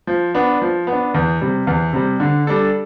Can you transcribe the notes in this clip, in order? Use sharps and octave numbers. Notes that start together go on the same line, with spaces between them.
F3
B3 D4
F3
B3 D4
E2
C3 G3
E2
C3 G3
D3
G3 D4 A4